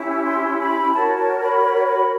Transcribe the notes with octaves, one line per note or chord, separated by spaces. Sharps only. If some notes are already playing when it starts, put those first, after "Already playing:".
Already playing: C#4 E4 G4
C6
B5
F#4 A#4 C#5 A5
A5
B5
B5
B5